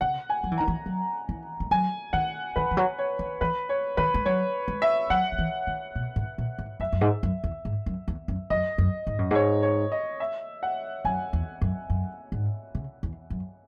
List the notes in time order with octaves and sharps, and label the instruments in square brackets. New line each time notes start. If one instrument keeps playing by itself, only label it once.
[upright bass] C#3 [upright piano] F#5
[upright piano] G#5
[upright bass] F#3
E3
[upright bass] D#3 [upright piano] A#5
[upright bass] E3
F#3
E3
G#3
[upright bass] F#3 [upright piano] G#5
[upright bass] D#3 [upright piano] F#5
[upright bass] D#3 [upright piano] B4
[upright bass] E3
F#3
[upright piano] C#5
[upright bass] E3
[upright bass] E3 [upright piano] B4
[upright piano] C#5
[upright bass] D#3 [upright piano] B4
[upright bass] G#3
[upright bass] F#3 [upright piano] C#5
[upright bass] G#3
[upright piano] E5
[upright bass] F#3 [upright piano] F#5
[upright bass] F#3
E3
D#3
B2
G#2
A#2
G#2
[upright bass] F#2 [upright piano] E5
[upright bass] F#2
G#2
F#2
E2
G#2
F#2
E2
F#2
[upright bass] F#2 [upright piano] D#5
[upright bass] F#2
G#2
F#2
[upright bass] G#2 [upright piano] C#5
[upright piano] C#5
D#5
E5
F#5
[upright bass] F#2 [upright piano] G#5
[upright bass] E2
F#2
F#2
G#2
C#3
E2
F#2